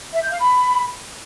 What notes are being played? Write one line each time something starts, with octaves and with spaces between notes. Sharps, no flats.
E5
G6
F5
B5